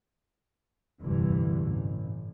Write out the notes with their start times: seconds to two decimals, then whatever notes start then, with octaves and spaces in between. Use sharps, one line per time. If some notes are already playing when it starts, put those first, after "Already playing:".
1.01 F1 D2 G2 D3 E3
1.60 A1